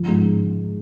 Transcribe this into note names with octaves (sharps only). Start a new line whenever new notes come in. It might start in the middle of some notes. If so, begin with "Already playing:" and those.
Already playing: F3
G#2